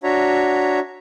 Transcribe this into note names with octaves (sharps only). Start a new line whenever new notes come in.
D4 F#4 C#5 E5 A#5